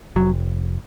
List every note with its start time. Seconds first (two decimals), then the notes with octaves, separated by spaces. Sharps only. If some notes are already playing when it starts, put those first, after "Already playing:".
0.16 F1 F#3